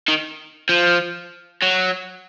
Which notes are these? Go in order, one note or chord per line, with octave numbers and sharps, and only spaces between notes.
D#3
F3
F#3